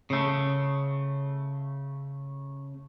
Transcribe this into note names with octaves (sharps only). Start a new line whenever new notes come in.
C#3 A3